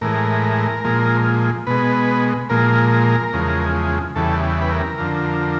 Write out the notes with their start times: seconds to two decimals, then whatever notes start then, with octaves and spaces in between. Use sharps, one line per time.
0.01 A2 E3 G#3 A#4
0.84 A#2 F3 G#3
1.67 B2 G#3 B4
2.49 A#2 F3 G#3 A#4
3.33 E2 C#3 F3 G#3
4.16 E2 C#3 E3 G3 A4
4.62 B4
4.71 A#4
4.98 F2 D3 F3